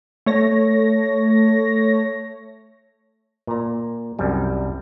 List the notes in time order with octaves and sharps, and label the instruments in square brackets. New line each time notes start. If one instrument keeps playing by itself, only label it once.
[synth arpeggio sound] A3 C#5 A#6
[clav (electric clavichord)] A#2 A#5
C2 F#2 G3